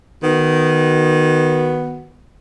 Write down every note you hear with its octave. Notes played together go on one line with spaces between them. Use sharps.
D#3 B3 F#4